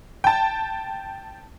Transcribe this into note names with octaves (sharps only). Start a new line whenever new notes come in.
G5 A5